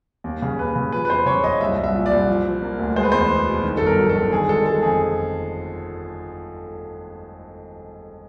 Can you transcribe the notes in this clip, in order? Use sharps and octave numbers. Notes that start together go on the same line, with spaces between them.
D#2
C#3
D#2 B4
C#3
F3 B4
B4
E2 C5
C#3 C#5
F#1 D#5
C2 E5
C2
E5
A#2
D5
C2
F3
F3
A#3
D2
G#3 C5
B4
E2 C5
B3
B2
D#3
A4
G1
A#4
F#3
A4
D#3
D3 G#4
G#3 A4
G#3 A4
F2 G#4